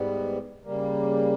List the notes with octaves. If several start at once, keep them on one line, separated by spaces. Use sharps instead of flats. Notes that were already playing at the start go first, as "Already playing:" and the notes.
Already playing: G#2 G3 B3
C#3 G3 A#3